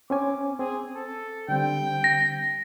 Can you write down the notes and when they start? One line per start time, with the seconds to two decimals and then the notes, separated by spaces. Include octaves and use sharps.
0.10 C4 C#4 G#5 D6
0.59 C4 G#4
0.95 A4
1.49 D3 G3 C4 G5
2.04 A#6